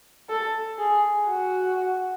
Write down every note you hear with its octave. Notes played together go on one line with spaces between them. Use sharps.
A4
G#4
F#4